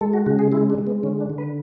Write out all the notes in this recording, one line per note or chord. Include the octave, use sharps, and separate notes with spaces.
G#3 A4
F#4
C#3 F#4
G#4
G#3 E4
D4
G#3
B3
D3 C#4
D4
D3
B4